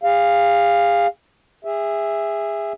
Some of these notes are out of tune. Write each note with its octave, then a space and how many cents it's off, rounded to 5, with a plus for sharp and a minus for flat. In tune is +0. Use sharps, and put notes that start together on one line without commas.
G#4 -35 F5 +0
G#4 -25 E5 +0